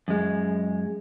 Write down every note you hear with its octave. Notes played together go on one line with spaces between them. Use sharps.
F#2 G#3